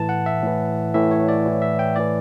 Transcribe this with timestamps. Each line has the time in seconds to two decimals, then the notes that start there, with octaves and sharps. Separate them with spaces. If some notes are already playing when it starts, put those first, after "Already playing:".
Already playing: A2 E3 A5
0.09 F#5
0.26 E5
0.43 A2 E3
0.94 A2 E3 E5
1.11 C#5
1.28 D5
1.46 A2 E3
1.62 E5
1.79 G5
1.96 A2 E3 D5